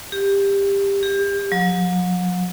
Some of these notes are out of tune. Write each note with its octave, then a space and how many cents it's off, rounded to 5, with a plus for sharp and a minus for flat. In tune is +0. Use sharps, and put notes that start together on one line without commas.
G4 +15
G4 +30
F#3 -45